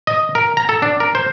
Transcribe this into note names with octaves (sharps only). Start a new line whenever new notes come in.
D#5
A#4
A#5
A4
D4
A#4
C5